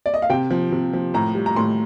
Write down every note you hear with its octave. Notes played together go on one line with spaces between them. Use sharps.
D5
D#5
F5
C3 G5
F3
C3
F3
A2 A#5
G3
A#5
A2 C6